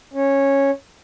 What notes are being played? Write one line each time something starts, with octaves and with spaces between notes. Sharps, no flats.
C#4